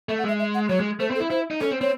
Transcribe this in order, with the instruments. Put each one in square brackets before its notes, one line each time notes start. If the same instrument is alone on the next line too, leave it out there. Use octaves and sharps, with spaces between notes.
[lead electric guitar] A3 [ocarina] E5
[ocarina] F#5
[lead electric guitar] G#3 [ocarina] E5
[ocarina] E5
F#5
[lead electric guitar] F#3 [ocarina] C#5
[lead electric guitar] G#3
[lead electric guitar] A3 [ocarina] C5
[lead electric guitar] C4
[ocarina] A4
[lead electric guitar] E4
[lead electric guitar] E4 [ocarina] C5
[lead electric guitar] D#4
[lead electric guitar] C#4 [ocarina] A4
[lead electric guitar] C4
[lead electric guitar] C4 [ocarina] C#5